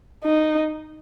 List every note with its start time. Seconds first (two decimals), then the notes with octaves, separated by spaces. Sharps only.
0.24 D#4